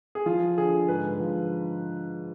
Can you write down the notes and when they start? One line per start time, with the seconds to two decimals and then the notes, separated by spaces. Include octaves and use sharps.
0.15 G#4
0.26 F3 F4
0.58 D3 G#4
0.88 G#2 B4
1.20 F3